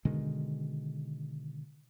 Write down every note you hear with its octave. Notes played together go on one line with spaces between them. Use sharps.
B2 D3 D#3 G#3